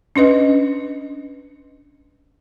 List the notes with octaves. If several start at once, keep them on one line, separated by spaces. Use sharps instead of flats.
C#4 D4 B4 D#5